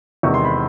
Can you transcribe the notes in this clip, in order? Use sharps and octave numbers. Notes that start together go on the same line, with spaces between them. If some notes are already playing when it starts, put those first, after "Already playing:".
E2 C3 D#3 G#3 C#6
C6
B5